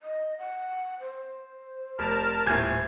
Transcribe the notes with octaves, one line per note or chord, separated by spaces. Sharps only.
D#5
F#5
C5
F1 A#4 A5 F6
D#1 A2 G#5 G6 G#6